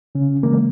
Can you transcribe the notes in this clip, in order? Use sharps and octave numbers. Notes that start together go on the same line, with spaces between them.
C#3 C#4
C#3 E3 G#3 A#3